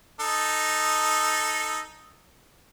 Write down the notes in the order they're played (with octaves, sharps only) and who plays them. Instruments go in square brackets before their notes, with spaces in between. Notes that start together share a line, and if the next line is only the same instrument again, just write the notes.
[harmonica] D#4 A4